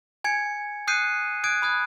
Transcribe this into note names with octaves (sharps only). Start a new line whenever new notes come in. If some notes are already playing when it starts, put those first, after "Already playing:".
G#5 G#6 C#7
D#6 F#6 G6 C7 C#7 D#7
D#6 F#6 G#6 D7
B5 D#6 F#6 G#6